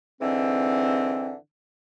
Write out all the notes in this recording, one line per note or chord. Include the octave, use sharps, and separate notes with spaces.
G#2 D3 E3 C4